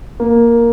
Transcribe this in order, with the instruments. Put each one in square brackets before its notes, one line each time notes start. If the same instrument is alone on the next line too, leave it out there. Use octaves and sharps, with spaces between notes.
[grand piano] A#3